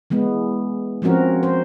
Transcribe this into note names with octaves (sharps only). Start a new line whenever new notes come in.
E3 G#3 B3
F3 C4 C#4 F#4 A#4
C5